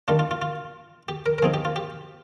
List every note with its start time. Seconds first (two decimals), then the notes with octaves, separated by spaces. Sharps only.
0.08 D#3 G3 D4 F4
0.19 F4
0.31 F4
0.42 F4
1.08 G4
1.26 A#4
1.38 A#4
1.42 F3 C4 D#4 G#4
1.54 G4
1.65 F4
1.76 G4